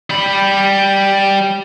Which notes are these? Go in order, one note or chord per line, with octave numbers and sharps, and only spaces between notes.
G3 B5